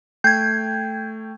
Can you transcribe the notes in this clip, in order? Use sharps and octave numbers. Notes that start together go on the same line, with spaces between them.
A3 G5 G6 G#6 C7